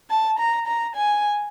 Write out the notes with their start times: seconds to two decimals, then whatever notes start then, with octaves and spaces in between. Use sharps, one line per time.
0.10 A5
0.39 A#5
0.67 A#5
0.95 G#5